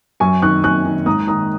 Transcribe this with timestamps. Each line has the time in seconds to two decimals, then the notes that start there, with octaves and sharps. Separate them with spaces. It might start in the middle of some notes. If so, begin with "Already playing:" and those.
0.20 F#2 G#5 C#6
0.42 D#3 C#6 F#6
0.64 F#2 C#6 F#6
0.85 D#3
1.06 G#2 A#5 D#6
1.27 D#3 A#5 D#6